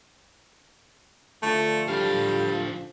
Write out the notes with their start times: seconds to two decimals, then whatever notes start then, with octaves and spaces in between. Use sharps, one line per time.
1.43 D3 F3 A3
1.88 G3 D4 F5